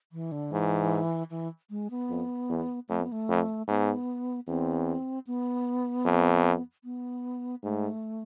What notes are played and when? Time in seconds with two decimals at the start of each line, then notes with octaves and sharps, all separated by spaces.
0.12 E3
0.32 D3
0.52 G#2 E3
1.30 E3
1.70 G#3
1.91 B3
2.10 F2
2.49 E2
2.89 F2 A3
3.00 B3
3.12 A3
3.29 F2
3.68 G#2 B3
4.47 E2 C4
5.27 B3
6.05 F2
6.84 B3
7.63 G#2 A3